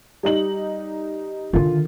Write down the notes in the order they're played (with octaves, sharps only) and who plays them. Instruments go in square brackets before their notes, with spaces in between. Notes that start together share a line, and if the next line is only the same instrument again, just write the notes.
[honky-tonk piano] G3 D#4 F#7
[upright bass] D3 D#3 [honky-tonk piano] F4